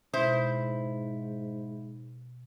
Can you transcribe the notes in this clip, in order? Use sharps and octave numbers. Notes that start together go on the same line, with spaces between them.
G#2 B2 E4 C5